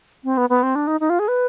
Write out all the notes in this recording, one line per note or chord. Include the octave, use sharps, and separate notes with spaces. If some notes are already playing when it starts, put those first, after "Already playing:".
C4
B3
B3
C4
D4
D#4
D#4
F4
G#4
B4